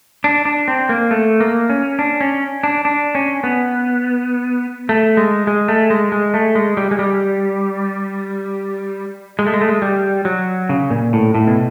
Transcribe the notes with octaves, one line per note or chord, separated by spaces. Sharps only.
D4
D4
C4
A#3
A3
A#3
C#4
D4
C#4
D4
D4
C#4
B3
A3
G#3
G#3
A3
G#3
G#3
A3
G#3
G3
G#3
G3
G#3
A3
G#3
A3
G#3
G3
F#3
C#3
A#2
A2
A2
B2